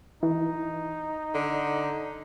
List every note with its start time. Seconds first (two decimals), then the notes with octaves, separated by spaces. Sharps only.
0.23 E3 D#4
1.35 D3